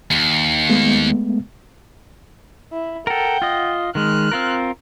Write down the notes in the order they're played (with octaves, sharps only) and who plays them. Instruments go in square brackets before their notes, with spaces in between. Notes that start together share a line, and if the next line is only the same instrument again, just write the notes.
[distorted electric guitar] D#2
[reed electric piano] G#3 A3 B3
[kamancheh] E4
[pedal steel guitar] A4 A#4 [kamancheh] F#5 G5
[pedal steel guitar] F4 D#5
[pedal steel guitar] D#3 G#3 [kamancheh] F6 F#6
[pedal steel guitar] C4 F4 A#4